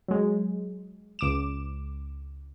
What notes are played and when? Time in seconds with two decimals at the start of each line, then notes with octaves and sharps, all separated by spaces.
0.08 F#3 G#3
1.19 C#2 D6 E7